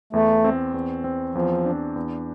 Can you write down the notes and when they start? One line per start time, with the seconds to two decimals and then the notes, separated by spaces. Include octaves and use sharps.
0.13 E2 A3
0.44 C4
0.74 E2
1.04 C4
1.35 E2 F3
1.66 D4
1.96 E2